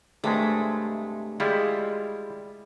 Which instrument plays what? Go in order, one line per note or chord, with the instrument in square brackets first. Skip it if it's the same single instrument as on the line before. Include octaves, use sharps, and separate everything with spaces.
[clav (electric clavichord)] G2 C3 G#3 [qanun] A3
[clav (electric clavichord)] G3 E4 F4 [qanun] G#3